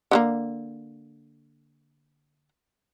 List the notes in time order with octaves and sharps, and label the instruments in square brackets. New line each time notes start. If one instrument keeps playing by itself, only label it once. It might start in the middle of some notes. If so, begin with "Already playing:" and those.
[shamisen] D3 G3 A#3